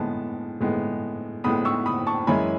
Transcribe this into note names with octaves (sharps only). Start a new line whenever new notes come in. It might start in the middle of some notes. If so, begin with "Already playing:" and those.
Already playing: A2 G#3 B3 A5
A2 G#3 B3
A2 G#3 B3 B5 D#6
C#6 E6
B5 D#6
A5 C#6
F#2 E3 G#3 C#4 E4 G#5 B5